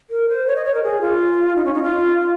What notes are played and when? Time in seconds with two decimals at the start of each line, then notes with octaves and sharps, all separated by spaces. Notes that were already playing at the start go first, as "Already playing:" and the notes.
0.10 A#4
0.29 C5
0.47 C#5
0.56 D#5
0.65 C#5
0.74 A#4
0.83 G#4
1.01 F4
1.56 D#4
1.65 C#4
1.74 D#4
1.83 F4